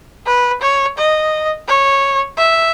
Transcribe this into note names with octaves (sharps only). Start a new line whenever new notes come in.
B4
C#5
D#5
C#5
E5